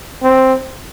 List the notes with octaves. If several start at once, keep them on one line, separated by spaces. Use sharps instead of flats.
C4